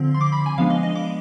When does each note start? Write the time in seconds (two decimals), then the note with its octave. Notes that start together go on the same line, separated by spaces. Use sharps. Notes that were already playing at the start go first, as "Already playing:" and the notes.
Already playing: D3 F3 C4
0.14 C6
0.21 D6
0.32 B5
0.46 G#5
0.58 F3 G#3 B3 D4 F5
0.70 D#5
0.83 D#5
0.95 D6